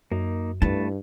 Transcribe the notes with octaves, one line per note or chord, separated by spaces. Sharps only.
F#2 A#3 D#4
G2 A3 E4 B4 A5